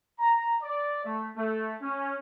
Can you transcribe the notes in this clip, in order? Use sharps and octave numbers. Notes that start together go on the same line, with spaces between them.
A#5
D5
A3
A3
C#4